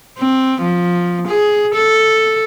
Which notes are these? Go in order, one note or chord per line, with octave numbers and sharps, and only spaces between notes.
C4
F3
G#4
A4